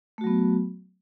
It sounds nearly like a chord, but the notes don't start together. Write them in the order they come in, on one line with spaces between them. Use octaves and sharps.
A3 F#4 F#3 B3